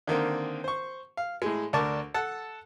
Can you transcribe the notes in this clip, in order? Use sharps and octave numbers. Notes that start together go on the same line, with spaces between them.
D3 D#3 A#3 C4
C5 C#6
F5
A2 G#3
D2 D4 A#4 A5 C#6 D6
A4 F#5 A5